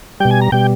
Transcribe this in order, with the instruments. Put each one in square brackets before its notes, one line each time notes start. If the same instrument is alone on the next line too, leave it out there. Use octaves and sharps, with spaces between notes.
[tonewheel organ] G3 G5
B2
G#5
A#5
B2 G3 G5